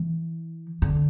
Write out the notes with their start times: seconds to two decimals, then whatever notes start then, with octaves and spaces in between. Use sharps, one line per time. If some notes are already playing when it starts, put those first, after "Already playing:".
Already playing: E3
0.82 D3